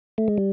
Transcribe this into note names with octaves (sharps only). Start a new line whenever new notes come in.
A3
G#3
G3